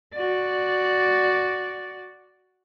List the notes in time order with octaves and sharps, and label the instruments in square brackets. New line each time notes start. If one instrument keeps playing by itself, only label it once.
[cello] F#4 D5